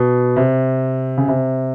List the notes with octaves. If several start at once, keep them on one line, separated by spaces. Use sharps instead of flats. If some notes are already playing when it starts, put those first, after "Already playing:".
Already playing: B2
C3
C#3
C3